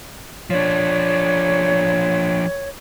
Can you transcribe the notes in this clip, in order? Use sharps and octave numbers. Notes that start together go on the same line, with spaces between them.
F3 D4 C#5